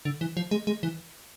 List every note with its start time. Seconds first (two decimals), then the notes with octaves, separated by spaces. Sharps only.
0.05 D3
0.21 E3
0.37 F3
0.51 G#3
0.67 G#3
0.83 E3